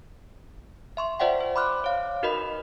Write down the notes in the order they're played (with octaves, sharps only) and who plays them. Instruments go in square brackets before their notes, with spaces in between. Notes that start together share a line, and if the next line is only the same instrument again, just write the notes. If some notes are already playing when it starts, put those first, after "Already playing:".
[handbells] E5 C6 C#6
F4 C5 D5 E5 F#5 G5
C5
B5 C6 D6 F6 F#6
C#5 F5
D#4 F#4 A#4 B4 D#5 B5